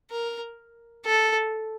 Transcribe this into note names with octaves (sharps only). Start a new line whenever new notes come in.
A#4
A4